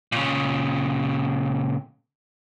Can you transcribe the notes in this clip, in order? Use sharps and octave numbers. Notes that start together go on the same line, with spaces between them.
A#2 C#3